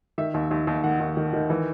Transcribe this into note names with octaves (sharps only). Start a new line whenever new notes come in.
D#3 E5
D#2
D#2
D#2
D#3 F#5
D#2
D#3
D#3
E3